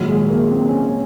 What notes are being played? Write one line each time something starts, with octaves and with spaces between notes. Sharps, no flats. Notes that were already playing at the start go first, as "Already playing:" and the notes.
Already playing: A#1 G#2 D#3 F#3
G#3
A#3
C4
C#4
C#4